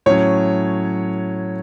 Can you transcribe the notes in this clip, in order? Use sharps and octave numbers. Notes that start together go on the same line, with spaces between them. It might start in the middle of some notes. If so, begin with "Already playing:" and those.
A2 F#3 C#4 C#5